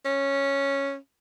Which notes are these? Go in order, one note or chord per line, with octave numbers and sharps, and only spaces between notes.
C#4